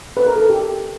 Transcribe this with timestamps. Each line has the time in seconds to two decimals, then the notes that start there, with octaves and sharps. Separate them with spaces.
0.17 B4
0.26 A#4
0.36 A4
0.50 G4